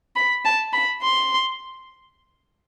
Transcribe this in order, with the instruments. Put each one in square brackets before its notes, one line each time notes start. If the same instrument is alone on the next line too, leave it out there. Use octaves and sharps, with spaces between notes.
[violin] B5
A5
B5
C6